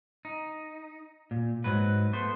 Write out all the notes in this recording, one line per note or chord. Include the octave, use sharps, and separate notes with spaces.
D#4
A#2
G#2 F#3 B4
A3 B3 C5